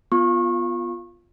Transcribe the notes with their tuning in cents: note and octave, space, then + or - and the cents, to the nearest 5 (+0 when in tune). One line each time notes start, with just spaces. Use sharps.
B3 +0 F4 +0 C#6 -30